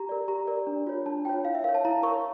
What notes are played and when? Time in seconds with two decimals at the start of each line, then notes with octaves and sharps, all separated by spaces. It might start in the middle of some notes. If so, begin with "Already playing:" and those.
Already playing: G4 A#5
0.09 A#4 D5
0.28 G4 A#5
0.47 A#4 D5
0.67 D4
0.87 F4 C#5
1.06 D4 A5
1.25 F4 C#5 G5
1.45 E4 F5
1.55 E5
1.64 A#4 C#5 F5
1.75 A5
1.85 E4 A#5
2.03 A#4 C#5 C#6